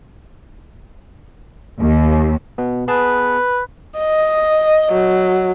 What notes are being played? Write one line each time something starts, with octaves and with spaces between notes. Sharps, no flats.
D#2
B2 B3
B3 G#4 B4 A5
D#5
F#3